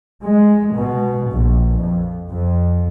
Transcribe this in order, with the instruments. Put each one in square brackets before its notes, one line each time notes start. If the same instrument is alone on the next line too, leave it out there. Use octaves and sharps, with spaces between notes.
[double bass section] G#3
B2
A#1
F2
F2